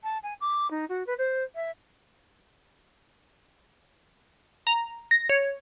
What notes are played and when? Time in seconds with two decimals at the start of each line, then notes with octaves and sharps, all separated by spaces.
0.03 A5
0.23 G#5
0.40 D6
0.70 D#4
0.89 F#4
1.06 B4
1.18 C5
1.55 E5
4.67 A#5
5.11 A#6
5.29 C#5